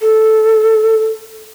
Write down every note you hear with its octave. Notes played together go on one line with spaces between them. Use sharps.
A4